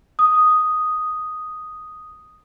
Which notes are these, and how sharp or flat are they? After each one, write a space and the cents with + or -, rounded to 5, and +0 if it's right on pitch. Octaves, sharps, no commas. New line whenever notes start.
D#6 +0